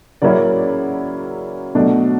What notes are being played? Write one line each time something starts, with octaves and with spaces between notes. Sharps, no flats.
C#3 F#3 A#3 C#4 E4 D5
B2 F#3 A3 D4